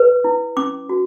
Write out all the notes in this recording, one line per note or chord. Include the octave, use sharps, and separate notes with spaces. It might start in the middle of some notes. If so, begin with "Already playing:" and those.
Already playing: B4
E4
C#4 D6
F#4